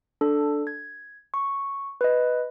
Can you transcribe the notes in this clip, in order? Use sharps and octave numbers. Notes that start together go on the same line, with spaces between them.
D4 A4
G#6
C#6
B4 D#5